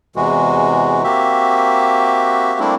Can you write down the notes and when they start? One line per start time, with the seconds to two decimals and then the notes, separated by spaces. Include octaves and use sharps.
0.16 E2 C3 E3 G#3 F#4
1.04 A#3 C4 F#4 G4 E5
2.60 G3 A3 A#3 C4 D4 E4